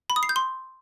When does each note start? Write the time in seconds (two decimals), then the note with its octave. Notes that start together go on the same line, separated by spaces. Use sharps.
0.10 B5
0.16 D#6
0.23 C7
0.29 G6
0.36 C6